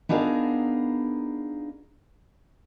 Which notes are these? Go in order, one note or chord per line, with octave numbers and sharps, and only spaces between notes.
B3 D4 D#4 F4 G#4 A#4